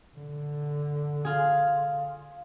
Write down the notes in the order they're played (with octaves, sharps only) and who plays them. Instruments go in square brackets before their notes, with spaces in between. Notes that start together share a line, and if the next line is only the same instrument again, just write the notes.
[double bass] D3
[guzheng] F4 G#4